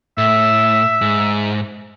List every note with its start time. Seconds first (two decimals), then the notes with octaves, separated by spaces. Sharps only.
0.18 A2 E5
1.01 G#2